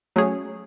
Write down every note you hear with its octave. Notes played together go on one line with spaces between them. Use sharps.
F#3 A3 C#4 G#4 C#5